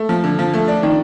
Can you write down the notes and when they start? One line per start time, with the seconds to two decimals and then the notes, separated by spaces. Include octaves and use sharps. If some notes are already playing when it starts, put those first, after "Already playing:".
Already playing: A3
0.09 F3
0.24 D3
0.39 F3
0.54 A3
0.68 D4
0.83 D#3